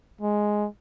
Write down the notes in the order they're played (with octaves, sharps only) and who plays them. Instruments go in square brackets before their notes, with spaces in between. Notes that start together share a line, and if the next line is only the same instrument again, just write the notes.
[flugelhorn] G#3